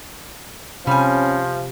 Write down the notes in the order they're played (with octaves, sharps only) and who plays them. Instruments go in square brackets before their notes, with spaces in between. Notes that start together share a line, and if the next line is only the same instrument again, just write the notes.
[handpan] C3 [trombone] F3 [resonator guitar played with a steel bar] G3 G#5 [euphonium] C#4